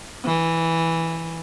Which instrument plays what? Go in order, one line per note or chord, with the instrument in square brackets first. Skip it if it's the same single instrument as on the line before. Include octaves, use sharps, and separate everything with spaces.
[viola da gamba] E3